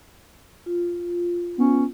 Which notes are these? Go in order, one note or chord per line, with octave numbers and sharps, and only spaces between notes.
F4
B3 C#4